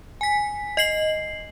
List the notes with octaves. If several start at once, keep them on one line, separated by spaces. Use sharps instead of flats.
G#5 B6
D#5 C7 F#7